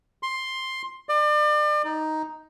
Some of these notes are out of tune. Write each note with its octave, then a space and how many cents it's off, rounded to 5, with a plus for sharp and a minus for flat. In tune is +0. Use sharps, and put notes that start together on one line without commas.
C6 +10
D5 +35
D#4 +5